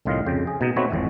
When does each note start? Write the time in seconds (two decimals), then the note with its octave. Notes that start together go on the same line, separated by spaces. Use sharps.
0.05 C2 A2 D#3 F4 D#5 F5
0.26 F2 C#3 G5
0.47 G#4
0.61 B2 D#4
0.76 A3 C4 D#4 F#4 B4 C#5
0.90 G#1 F2 A2 E3